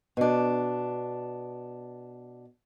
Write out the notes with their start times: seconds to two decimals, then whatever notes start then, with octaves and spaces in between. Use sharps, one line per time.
0.17 B2 D4